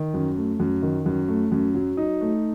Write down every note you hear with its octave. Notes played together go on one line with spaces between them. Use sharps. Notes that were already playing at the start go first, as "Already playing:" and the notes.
Already playing: D#3
F#2
A3
F#2
D#3
F#2
A3
F#2
F#3
D#4
A3